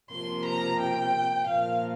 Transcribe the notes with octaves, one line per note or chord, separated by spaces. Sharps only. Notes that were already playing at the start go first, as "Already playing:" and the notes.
C3 F3 A#3 C6
A#5
G5
A#2 F3 A#3 F5